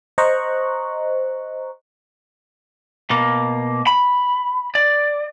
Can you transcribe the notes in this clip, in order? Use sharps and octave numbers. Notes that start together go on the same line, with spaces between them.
C5 D#5 A#5 C#6 F#6
B2 A#3
B5
D5